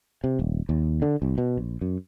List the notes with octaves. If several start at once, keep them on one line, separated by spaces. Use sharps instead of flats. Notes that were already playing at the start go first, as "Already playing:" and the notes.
C3
D#1
D#2
D3
C2
B2
A#1
F#2